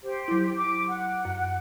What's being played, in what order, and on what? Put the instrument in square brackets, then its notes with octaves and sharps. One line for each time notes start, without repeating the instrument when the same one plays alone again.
[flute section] G4 C5
[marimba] F#3 E4
[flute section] D6
F#5
[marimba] F#2